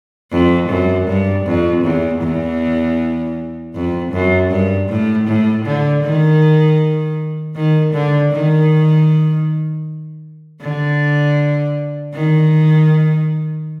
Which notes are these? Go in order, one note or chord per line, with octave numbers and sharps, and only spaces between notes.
F2
F#2
G2
F2
E2
E2
F2
F#2
G2
A2
A2
D3
D#3
D#3
D3
D#3
D3
D#3